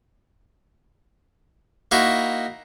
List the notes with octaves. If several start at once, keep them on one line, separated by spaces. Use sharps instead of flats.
A#3 D#4 E4 F#4